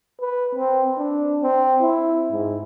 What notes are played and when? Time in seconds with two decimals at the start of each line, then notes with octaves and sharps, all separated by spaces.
0.21 B4
0.55 C4
0.98 D4
1.42 C4
1.81 E4
2.32 G#2